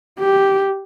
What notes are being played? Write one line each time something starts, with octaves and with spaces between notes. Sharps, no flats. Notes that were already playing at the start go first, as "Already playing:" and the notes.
G4